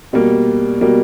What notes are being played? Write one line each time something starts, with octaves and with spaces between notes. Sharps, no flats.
B2 G3 A#3
B2 G3 A#3